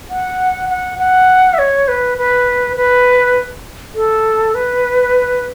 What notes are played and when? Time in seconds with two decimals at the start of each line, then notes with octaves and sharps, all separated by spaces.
0.10 F#5
0.69 F#5
0.99 F#5
1.54 E5
1.59 C#5
1.88 B4
2.18 B4
2.77 B4
3.95 A4
4.55 B4